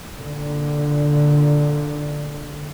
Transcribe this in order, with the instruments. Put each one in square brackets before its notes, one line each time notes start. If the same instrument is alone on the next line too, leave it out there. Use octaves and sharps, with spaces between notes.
[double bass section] A#2 D3